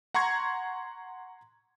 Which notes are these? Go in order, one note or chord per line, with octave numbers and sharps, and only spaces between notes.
F#5 A#5 C6 C#6 G#6